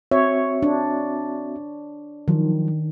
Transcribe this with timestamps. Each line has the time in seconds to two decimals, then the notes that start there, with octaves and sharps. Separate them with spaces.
0.12 C4 F#4 C#5 E5
0.62 D4
2.28 D#3 F3 F#3